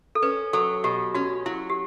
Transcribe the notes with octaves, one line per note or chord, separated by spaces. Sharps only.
A4
C#4 B4
F#3 A4
B2 G4
C#4 F#4
F#3 E4
G4